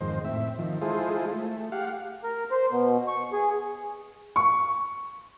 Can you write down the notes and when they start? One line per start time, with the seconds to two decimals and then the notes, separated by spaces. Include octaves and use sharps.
0.01 F2 G#2 D#3 C5
0.25 A2 C4 E5
0.59 D#3 F3
0.82 G#3 E4 F4 G#4 A4 C5
1.32 A3
1.72 G4 F5 F#5
2.24 A#4
2.51 C5
2.71 B2
3.08 C#6
3.33 G#4
4.36 C#6